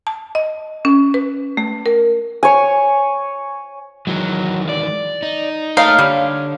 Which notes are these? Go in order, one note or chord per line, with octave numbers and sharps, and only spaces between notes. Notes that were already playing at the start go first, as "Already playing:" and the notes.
A5
D#5
C#4
B4
A3
A#4
C#5 G#5
D#3 E3 F#3 G#3
D5
D#4
A3 D#4 C#5 F5 A5
D3 G3